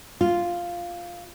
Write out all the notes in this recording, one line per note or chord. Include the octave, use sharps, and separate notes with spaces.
F4